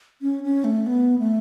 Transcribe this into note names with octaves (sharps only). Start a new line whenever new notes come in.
C#4
C#4
A3
B3
A3